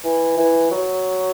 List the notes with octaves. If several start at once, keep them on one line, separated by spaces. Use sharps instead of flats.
E3
E3
F#3